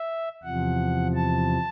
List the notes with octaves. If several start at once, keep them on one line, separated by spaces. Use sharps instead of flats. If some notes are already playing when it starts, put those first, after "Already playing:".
Already playing: E5
E2 C3 F3 F#5
A5